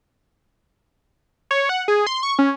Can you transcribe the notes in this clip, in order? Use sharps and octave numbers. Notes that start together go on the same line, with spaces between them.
C#5
F#5
G#4
C6
C#6
C#4